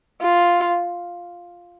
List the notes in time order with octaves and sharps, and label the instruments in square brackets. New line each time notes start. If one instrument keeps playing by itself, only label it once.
[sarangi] F4